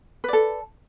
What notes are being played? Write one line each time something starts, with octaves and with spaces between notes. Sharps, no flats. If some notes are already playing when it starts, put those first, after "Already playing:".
A4 B4 D5